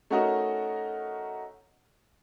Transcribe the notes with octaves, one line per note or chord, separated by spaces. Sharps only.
A3 C#4 D#4 F#4 A#4 D#5